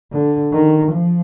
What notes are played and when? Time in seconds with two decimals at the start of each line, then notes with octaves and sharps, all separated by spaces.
0.12 D3
0.53 D#3
0.93 F3